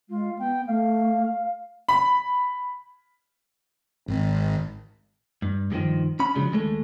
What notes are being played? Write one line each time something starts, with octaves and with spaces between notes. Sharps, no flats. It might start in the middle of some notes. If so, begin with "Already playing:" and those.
G#3 F4
B3 G5
A3 F5
B5
G#1
G2
G2 A#2 D3 D#3 F3
C#4 B5
C#3 F3 F#3 G#3 D4
D#2 G#3 A3